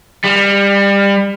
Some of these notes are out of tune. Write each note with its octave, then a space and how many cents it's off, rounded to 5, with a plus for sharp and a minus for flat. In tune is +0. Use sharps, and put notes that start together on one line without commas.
G3 +25